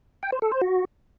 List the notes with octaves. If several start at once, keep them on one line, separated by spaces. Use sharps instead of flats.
G5
C5
A4
C5
F#4